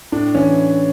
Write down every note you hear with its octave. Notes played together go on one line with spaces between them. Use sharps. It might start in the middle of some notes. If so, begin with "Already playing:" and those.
A2 D4
E3 C#4